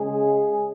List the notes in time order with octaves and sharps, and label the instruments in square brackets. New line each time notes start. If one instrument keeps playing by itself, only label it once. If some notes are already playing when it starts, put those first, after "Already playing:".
Already playing: [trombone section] C#3 G#3 G#4